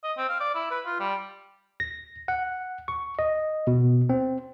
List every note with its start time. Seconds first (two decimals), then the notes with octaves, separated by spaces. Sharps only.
0.03 D#5
0.17 C4
0.29 F5
0.40 D5
0.55 E4
0.71 B4
0.86 F4
1.00 G3
1.80 A#6
2.28 F#5
2.88 C#6
3.19 D#5
3.67 B2
4.09 C4